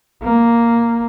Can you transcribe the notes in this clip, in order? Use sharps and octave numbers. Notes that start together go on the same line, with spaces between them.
A#3